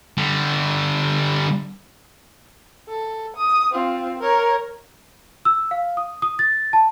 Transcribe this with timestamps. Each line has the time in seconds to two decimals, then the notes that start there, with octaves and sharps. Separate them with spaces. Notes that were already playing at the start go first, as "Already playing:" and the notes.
0.17 D3 G3
2.89 A4
3.37 D#6
3.72 C4 F4
4.19 A#4 C#5
5.45 E6
5.71 F5
5.97 D#6
6.22 D#6
6.39 A6
6.73 A5